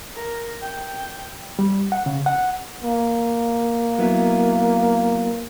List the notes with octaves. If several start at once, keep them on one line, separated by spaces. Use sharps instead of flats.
A#4
G5
G3
F#5
C#3
F#5
A#3
F#3 B3 E4